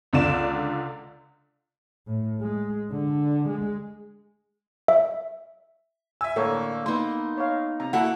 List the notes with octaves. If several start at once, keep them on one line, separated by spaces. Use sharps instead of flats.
C#2 D3 D5 E7
A2
G#3
D3
G#3
E5
E5 G#5 E6
A2 D3 A#3 A4 A#4 C#5
A#3 B3 D#4 C6
C#5 F5
C3 A#5
A#3 E4 F#4 A4 F#5